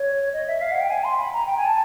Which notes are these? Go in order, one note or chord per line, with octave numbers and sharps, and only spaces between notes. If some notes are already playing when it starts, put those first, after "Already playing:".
Already playing: C#5
D#5
E5
F5
F#5
G5
G#5
C6
B5
A#5
G5
G#5
A5